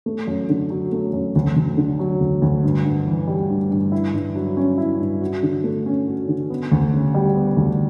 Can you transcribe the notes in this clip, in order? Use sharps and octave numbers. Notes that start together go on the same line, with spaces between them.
A3
F#2
D3
F#3
A3
F#2
D2
D2
D3
F#3
D2
D2
G2
G2
E3
G3
G2
G2
E4
G2
F#3
C#4
E4
G2
F#4
D3
A3
C#4
F#4
D3
B3
D2
C#3
G3
B3
D2